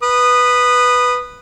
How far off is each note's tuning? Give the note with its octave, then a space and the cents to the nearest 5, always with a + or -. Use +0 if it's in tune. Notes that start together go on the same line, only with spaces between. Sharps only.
B4 +0 D#6 -20